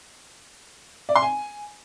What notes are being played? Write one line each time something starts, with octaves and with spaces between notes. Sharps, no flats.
D5
C6
G#5